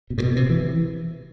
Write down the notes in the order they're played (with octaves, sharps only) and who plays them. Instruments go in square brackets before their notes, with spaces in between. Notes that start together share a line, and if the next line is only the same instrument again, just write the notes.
[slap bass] B2
A2
B2
C3
E3